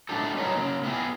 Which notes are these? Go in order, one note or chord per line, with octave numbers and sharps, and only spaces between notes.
G#3 A3 D4 E4 G4 A4
F#3 G3 D#4 A#4 B4 C#5
C#3 A#3
B3 E4 G4 G#4